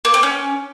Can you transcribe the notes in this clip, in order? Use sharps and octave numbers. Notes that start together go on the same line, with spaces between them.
A#3
C4
C#4